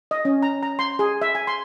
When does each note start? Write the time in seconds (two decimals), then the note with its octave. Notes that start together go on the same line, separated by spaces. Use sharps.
0.11 D#5
0.25 C#4
0.43 A#5
0.63 A#5
0.79 C6
0.99 G#4
1.22 E5
1.35 G#5
1.47 C6